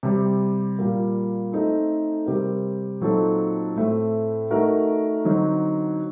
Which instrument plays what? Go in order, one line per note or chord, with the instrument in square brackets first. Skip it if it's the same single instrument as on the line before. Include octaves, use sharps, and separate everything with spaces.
[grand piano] C3 G3 C4
A#2 G3 A#3
A3 C4 D#4 A4
C3 G3 C4 G4 A#4
A#2 F#3 C4 D#4 A4
A2 A3 C4
A3 D#4 F#4 A#4
D3 F#3 C4 D#4